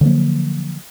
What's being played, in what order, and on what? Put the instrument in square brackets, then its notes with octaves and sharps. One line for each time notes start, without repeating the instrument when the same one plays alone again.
[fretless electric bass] D3 F3 F#3 A#3